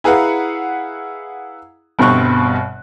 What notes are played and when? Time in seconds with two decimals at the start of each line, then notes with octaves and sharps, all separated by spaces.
0.04 E4 G#4 B4 F5 F#5 A#5
1.99 G1 G2 B2 C4 C#6 F#6